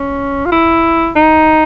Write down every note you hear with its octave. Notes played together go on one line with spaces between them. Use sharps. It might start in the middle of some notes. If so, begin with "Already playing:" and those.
Already playing: C#4
F4
E4
D#4